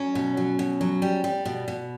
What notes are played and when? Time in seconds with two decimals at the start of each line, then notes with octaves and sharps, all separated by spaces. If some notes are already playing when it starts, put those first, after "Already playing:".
Already playing: F#3 C#4
0.15 B2
0.37 F#3
0.59 B2
0.81 F#3
1.02 G3
1.24 G3
1.45 B2
1.68 B2